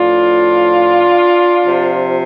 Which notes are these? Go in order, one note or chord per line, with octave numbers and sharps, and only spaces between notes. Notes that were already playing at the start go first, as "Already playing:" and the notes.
Already playing: A2 F3 D4 F4
C3 F3